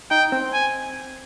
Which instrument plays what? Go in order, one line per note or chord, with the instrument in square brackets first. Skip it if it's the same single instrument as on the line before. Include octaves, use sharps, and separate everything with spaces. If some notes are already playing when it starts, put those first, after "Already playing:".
[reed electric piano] D#4 [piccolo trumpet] G5
[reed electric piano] C4
[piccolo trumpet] G#5